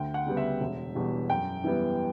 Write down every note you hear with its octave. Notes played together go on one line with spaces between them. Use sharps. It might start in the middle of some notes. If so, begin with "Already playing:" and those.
Already playing: D2 G5
F#5
C#3 G3 B3
E5
E1
E2 B2 G3
F#2 G5
E3 G3 B3